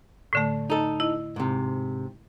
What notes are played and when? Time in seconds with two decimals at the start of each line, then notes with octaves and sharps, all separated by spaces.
0.33 A2 D3 A3
0.70 D#4 A4
1.00 E4 D#5
1.36 G#2 C3